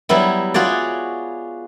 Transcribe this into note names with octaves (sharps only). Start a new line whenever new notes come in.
F#3 G3 B3 E4
F4 F#4 G#4 C#5 D5